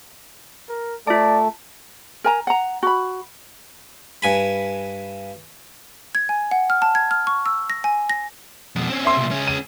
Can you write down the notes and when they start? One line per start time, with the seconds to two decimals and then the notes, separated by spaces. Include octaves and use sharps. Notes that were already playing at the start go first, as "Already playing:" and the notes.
0.69 A#4
1.07 A3 F4 A4 D5 A5
2.24 A#4 G#5 A#5
2.47 F#5 A#5
2.83 F#4 B5
4.22 G2 G#5 B5
6.15 G#6
6.29 G#5
6.51 F#5
6.70 F6
6.82 A5
6.95 G#6
7.11 F6
7.27 C#6
7.46 E6
7.70 A#6
7.84 G#5
8.10 A#6
8.76 F2 B2
8.89 C4 C#4
9.05 E5 C6
9.17 C2 A#2
9.31 C#2 C#4
9.47 D#7